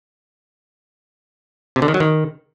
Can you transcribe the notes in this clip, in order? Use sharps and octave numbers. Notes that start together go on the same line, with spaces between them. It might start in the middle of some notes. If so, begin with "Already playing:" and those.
C3
D3
D#3
F#3
D#3